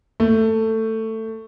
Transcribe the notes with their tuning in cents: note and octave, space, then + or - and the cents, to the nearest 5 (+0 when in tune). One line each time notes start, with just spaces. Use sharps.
A3 +15